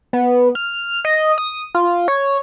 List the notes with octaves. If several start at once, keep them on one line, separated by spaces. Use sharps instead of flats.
B3
F6
D#5
D#6
F4
C#5